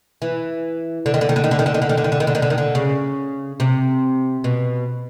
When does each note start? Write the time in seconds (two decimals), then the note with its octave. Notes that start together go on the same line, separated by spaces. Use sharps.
0.22 E3
1.06 D3
1.14 D#3
1.21 D3
1.29 D#3
1.36 D3
1.44 D#3
1.51 D3
1.59 D#3
1.66 D3
1.74 D#3
1.82 D3
1.89 D#3
1.97 D3
2.04 D#3
2.12 D3
2.20 D#3
2.27 D3
2.35 D#3
2.42 D3
2.50 D#3
2.58 D3
2.75 C#3
3.60 C3
4.44 B2